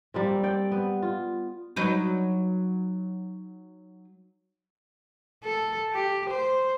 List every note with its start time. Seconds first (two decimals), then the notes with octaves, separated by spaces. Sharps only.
0.14 G3 A#3 C4
0.43 D5 G5
0.72 B3
1.02 F4
1.76 F#3 D#4 B4
5.44 A4
5.94 G4
6.30 C5